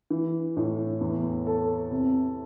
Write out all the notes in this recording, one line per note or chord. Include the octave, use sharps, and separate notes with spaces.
E3
A2
E2
A4
C3